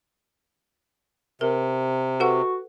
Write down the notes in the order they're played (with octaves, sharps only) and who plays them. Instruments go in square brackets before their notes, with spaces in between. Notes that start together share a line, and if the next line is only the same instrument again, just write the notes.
[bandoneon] C3 [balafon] A#4
[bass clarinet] F#4 [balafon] A4 B4 F#5